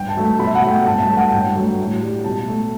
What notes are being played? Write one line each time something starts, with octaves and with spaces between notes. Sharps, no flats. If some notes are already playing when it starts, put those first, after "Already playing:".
Already playing: G2 G5
A5
F#3 A3
A5
B2 B5
E5
F#5
F#3 A3
G5
G2 A5
A5
F#3 A3
F#5
G2 G5
F#3 A3
A2
G3
B2 A5
A3